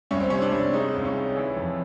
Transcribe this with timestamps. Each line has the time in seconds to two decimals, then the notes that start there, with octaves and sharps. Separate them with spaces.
0.11 C2 C#4
0.20 C4
0.30 C3 C#4
0.42 D4
0.52 C2
0.73 G#3 D#4
0.94 C#2
1.05 C#4
1.15 G#3
1.36 E3
1.57 F2